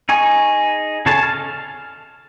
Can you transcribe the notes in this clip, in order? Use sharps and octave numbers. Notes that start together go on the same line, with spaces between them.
D#4 G#4 G#5 C#6
C#3 G#4 A4 C#5 A5
F6